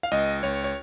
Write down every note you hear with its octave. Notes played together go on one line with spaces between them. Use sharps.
F5
C#2 D#5
C#2 C#5
C#5